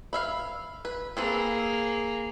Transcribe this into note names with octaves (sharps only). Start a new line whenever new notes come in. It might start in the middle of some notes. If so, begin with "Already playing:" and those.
B4 E5 F5
B4
A#3 C4 G#4 A4 B4